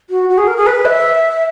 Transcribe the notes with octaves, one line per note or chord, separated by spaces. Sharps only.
F#4
F#4
G#4
A#4
G#4
B4
E5